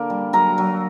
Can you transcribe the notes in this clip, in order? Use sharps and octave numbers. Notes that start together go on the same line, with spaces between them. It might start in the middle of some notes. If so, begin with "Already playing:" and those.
Already playing: D3 A#3
G3
F#3 A#4 A#5
F#3